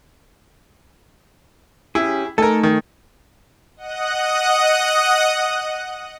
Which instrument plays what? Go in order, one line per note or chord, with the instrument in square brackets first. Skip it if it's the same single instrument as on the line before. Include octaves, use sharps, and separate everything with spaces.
[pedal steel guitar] C#4 G4 G#4 [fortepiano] E4
[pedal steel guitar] A3 D#4 G#5 [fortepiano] A4 A#4
[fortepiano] D#3
[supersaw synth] D#5 F#5 D#6 F#6